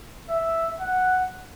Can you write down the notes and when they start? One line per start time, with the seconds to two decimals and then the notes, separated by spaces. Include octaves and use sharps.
0.29 E5
0.80 F#5